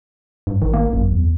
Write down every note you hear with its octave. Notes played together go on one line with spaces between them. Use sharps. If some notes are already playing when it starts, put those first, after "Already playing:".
G2
G#1 D#3
A#3
G#1 F#2
E2